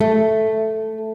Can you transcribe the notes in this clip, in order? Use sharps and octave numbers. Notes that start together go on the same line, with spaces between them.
A3